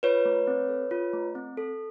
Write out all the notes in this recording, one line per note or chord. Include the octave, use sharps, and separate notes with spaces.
F4 B4 C#5
A3
C4
A4
F4
A3
C4
A4